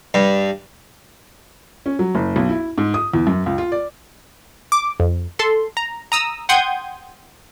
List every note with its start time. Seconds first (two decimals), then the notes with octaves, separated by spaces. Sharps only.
0.14 G2
1.86 C#4
1.99 F#3
2.15 F#1
2.36 B1
2.49 E4
2.78 G#2
2.94 D#6
3.14 E2
3.27 F#2
3.46 C#2
3.58 F4
3.72 D5
4.72 D6
5.00 F2
5.39 A4 C6
5.77 A#5
6.12 A#5 D#6 E6
6.49 F#5 G5 C6 D#6 G6 G#6